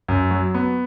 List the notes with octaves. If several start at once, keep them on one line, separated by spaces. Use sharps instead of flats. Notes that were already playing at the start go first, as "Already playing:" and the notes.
F#2
F#3
B3